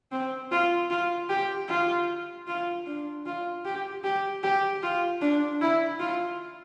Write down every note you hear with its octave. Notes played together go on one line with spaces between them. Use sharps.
C4
F4
F4
G4
F4
F4
D4
F4
G4
G4
G4
F4
D4
E4
F4